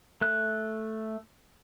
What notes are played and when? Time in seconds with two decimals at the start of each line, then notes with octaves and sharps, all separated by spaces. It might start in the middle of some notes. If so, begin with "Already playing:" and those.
0.21 A3 F#6